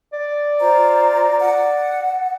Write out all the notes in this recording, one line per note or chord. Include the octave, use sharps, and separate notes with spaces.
D5
F4 C5 A#5
F#5